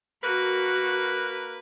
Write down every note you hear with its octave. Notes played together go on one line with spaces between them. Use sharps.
A#3 F#4 A#4 B4